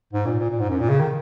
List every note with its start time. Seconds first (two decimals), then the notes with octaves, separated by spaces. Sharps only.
0.13 G#2
0.26 A#2
0.39 A#2
0.50 A#2
0.59 G#2
0.70 F#2
0.79 A#2
0.89 C#3
1.00 D#3